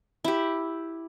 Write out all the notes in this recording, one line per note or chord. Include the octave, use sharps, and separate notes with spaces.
E4 G4